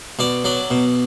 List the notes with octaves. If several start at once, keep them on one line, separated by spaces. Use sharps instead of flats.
B2 D5
F#3 D5
B2